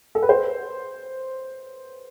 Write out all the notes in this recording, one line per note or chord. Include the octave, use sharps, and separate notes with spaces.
A4
B4
C5